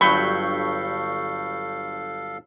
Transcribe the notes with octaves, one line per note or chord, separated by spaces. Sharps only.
G1 G2 F#3 A4 F5 B5 C#6 G6